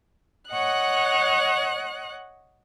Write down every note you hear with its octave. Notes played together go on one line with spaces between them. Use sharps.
C#5 D#5 F#5 F#6